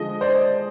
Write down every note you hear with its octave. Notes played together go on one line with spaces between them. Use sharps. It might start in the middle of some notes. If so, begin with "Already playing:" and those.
Already playing: D3 F3 G#3 D#5
C5 D5